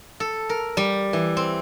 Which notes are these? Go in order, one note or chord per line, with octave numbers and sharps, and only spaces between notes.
A4
A#4
G3
E3
C4